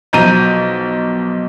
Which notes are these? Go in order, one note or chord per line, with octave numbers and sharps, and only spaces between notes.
B1 F3 A#5 G6 D#7